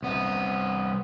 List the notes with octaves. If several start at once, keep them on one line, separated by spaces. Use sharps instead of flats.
C2 B3